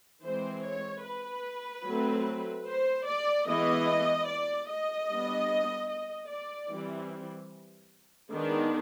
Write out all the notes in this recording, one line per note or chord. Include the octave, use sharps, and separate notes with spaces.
E3 G#3 C4 C5
C#5
B4
F#3 A3 C4
C5
D5
E3 G#3 B3 D#5
D5
D#5
G3 B3 D4
D#5
D5
E3 G3 C4
D#3 G#3 B3 D4